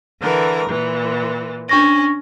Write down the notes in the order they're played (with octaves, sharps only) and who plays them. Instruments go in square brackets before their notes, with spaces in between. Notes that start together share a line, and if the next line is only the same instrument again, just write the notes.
[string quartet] D3 E3 A#4
A#2 E3
[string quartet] C#4 [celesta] D4 C#6 A#6